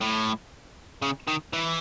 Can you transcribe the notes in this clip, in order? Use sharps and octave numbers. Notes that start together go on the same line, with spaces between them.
A2
C#3
D#3
E3